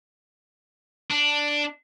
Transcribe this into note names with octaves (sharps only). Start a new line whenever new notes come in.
D4